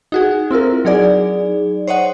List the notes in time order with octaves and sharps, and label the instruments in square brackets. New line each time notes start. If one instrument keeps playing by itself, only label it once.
[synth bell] D#4 F#4 G#4
C4 E4 F4 A#4
F#3 D#4 G#4 D5
C5 C#5 D#5 F#5